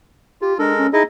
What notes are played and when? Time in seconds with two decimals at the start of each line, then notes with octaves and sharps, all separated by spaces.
0.42 F4 G4
0.59 G#3 D4 A4 A#4
0.79 C#4
0.93 D#4 E4 G#4 D#5